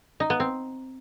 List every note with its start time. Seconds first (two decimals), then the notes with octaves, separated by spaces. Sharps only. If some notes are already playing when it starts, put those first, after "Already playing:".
0.20 D#4
0.30 B3
0.40 C4